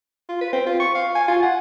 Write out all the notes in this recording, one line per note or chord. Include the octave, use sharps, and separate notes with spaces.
F4
B4
C4
F4
C#6
F5
G#5
F4
F#5